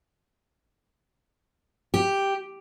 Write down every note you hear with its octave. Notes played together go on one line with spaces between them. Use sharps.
G4